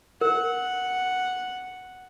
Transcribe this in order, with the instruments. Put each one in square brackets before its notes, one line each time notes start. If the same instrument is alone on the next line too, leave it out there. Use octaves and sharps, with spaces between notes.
[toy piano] A#4 [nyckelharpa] F#5